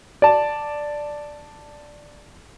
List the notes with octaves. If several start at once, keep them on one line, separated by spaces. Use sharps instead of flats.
D5 A5